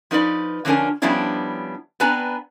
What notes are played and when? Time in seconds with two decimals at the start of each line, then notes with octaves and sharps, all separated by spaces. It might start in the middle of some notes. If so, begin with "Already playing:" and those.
0.11 F3 D#4 B4 D5
0.65 D3 F3 C#4 D4 A#4 G#5
1.02 F3 G3 B3 C#4 D4 E4
2.00 B3 C4 D4 B4 G#5 A#5